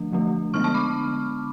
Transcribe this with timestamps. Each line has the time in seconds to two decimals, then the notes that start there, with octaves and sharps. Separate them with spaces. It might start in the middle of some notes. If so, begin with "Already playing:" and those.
Already playing: D3 F3 A3 D4
0.12 D3 F3 A3 D4
0.54 D3 G#3 B3 D4 C#6 F6
0.64 A5 C#6
0.74 B5 D6